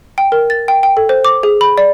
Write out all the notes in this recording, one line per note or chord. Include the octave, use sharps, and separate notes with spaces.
G5
A#4
A6
G5
G5
A4
C5
D6
G#4
B5
D5